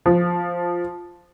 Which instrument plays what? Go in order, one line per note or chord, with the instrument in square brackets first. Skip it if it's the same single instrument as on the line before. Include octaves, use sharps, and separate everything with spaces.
[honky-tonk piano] F3